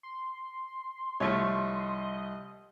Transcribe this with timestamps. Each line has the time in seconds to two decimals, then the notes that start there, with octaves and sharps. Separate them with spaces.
0.03 C6
1.20 C2 F3 A3 C#5 D#5